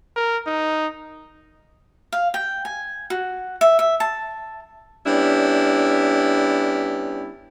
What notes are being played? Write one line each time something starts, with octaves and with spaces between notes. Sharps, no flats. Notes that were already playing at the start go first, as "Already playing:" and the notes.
A#4
D#4
F5
G5
G#5
F#4
E5
E5
A5
G3 B3 C#4 D4 E4